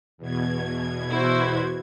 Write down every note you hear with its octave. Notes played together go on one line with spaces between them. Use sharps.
E2 B2 G#6
E4 F#4 C5